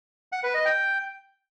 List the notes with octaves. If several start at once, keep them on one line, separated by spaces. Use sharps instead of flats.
F#5
B4
D#5
G5